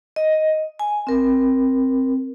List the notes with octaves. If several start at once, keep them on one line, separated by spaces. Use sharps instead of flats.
D#5
G#5
C4 A#4